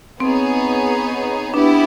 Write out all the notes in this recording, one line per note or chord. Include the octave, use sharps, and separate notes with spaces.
B3 C4 D#4 G#4 C#5
B3 D4 E4 G4